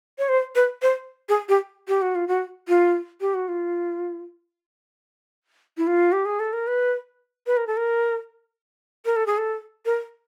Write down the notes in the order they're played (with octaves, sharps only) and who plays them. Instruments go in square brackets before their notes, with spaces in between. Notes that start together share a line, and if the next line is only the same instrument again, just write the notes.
[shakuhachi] C#5
C5
B4
C5
G#4
G4
G4
F#4
F4
F#4
F4
G4
F#4
F4
E4
F4
G4
G#4
A4
A#4
B4
B4
A#4
A4
A#4
A#4
A4
G#4
A4
A#4